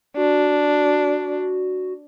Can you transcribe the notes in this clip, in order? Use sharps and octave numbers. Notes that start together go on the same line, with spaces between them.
D4 F#4